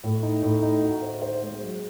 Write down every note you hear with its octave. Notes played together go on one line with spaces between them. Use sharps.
A2
D#4
A2
D#4
F#4
C5
C5
G#3
F#3